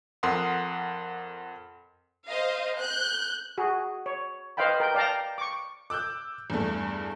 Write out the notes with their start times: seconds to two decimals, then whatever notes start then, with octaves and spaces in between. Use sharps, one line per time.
0.23 F2 A4 A#4 F#5 C6 D#6
2.27 C5 D#5 F5
2.78 F#6 G6
3.58 F#4 G#4
4.06 C#5
4.57 B4 C5 D#5 F5 G5 B5
4.80 A#4 G5
4.95 D5 F5 G5 A5 A#5
5.38 C#6 D6
5.90 D6 E6 F#6 G6
6.50 E2 G2 A3